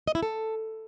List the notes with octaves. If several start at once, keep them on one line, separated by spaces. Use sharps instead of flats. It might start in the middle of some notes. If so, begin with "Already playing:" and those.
D#5
E4
A4